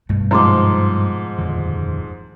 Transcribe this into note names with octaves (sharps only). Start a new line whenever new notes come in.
G2 B2 A3
G#2 F3 A#5 C6 D6
D#1 F2 D3